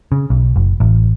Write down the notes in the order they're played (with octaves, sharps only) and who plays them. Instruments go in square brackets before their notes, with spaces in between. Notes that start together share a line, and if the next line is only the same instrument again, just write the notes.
[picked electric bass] C#3
B1
F#1
A1